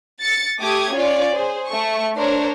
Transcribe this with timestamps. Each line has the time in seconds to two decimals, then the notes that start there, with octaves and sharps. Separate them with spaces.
0.20 A6 C#7
0.60 A3 G4 D6 D#6 G#6
0.94 C#4 F4 C#5 D5
1.35 G#4 C5
1.66 A3 C#6
2.15 D4 A#4 C5 C#5